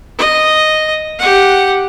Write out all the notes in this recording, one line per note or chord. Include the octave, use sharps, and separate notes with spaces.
D#5
G4 F#5